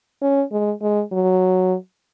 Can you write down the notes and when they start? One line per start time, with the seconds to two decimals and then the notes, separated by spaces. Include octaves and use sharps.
0.22 C#4
0.52 G#3
0.81 G#3
1.12 F#3